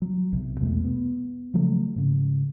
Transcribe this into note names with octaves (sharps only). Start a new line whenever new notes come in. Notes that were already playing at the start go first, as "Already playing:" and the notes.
F#3
B1 C3
E2 B2 G#3 A3
B3
C#3 F3 F#3 A3
G#2 C#3